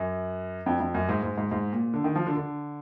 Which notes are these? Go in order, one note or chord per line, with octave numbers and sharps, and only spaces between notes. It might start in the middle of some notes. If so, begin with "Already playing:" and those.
Already playing: F#2
F2
F2
F#2
G#2
G#2
G#2
G#2
A#2
D3
D#3
F3
D3
D3